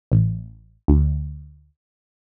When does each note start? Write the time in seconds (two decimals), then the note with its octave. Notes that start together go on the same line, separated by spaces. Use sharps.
0.12 A1
0.88 D2